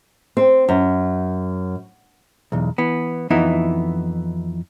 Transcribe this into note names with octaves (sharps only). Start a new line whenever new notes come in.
C4
F#2
B1 E2
E3 B3
F2 E3 B3 D#4 E4